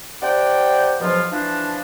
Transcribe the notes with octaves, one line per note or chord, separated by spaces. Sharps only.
C3 D5 F#5 G5
G#2 B2 F3 F#3 F4
E3 F3 D4